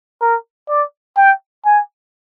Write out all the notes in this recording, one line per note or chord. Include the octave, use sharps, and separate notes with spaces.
A#4
D5
G5
G#5